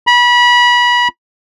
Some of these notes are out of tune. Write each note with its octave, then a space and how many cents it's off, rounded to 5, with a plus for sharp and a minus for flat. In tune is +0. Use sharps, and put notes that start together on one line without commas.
B5 -30